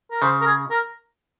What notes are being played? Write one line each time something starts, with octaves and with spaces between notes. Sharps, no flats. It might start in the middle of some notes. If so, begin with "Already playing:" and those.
A#4
C#3 C5
A#4
G#4
A#4